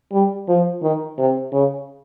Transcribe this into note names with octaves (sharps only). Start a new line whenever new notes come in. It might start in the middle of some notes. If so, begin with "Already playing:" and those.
G3
F3
D#3
C3
C#3